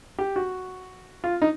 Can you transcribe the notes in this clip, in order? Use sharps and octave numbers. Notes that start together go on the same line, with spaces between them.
G4
F#4
F4
D#4